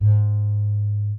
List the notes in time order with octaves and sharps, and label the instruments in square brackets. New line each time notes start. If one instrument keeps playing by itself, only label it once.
[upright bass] G#2